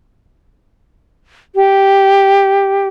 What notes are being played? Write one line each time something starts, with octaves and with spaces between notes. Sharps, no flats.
G4